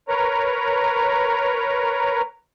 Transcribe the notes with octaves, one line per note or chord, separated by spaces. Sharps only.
A#4 B4 C#5 A#5